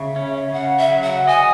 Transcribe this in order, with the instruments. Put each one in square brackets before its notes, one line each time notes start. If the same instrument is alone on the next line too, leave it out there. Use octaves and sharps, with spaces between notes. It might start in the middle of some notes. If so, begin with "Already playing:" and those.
Already playing: [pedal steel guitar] C#3 [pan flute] E5
[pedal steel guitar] C#4
[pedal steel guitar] C#3 [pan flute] F#5
[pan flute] E5
[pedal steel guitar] F#3
[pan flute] F#5
[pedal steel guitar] D#5 [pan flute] G#5